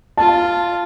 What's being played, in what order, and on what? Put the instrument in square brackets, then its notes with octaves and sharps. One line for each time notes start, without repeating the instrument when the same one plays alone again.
[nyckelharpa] F4 [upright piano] A5